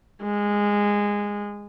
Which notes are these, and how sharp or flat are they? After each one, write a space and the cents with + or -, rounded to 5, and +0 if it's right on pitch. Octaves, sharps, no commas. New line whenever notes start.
G#3 -15